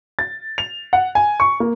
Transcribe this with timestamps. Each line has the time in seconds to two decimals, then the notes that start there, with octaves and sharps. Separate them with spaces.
0.19 A6
0.58 F7
0.93 F#5
1.15 G#5
1.40 C#6
1.60 A#3